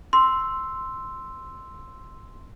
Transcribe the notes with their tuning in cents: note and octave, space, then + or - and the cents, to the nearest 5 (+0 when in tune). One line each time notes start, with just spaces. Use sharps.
C6 +0 E6 +0